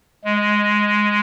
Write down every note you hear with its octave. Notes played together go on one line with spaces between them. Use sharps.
G#3